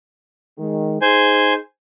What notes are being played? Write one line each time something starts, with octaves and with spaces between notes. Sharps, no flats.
D#3 G#3
D#4 G#4 C5 G#5